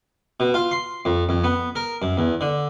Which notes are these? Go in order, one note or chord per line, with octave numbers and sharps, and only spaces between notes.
B2
F4
C6
F2
F2
B3
A#4
F#2
E2
D3